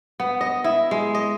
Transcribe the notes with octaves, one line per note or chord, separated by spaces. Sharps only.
B3
D#5
E4
G#3
D#5